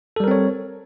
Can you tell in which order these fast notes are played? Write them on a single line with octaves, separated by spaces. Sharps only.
A4 G3 A#4 C4 C#5